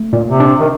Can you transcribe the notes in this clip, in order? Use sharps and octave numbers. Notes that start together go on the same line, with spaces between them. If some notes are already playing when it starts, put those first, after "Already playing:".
Already playing: A3
A#2
C3
D4
D#3